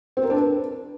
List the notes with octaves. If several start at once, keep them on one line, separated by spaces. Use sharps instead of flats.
C4
A#4
D4
B4